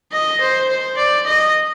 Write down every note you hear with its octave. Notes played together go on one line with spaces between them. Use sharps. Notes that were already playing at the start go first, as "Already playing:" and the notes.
D#5
C5
C5
D5
D#5